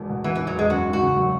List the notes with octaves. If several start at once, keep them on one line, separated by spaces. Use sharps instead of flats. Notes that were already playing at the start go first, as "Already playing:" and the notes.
Already playing: E1 E2
B2
E3 B3
E2 E3
F#3
E1 G#3
F#2 F#4
G#1
F#4
C#3
F#3